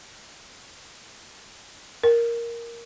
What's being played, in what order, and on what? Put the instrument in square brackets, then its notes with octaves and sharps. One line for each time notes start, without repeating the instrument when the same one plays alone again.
[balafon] A#4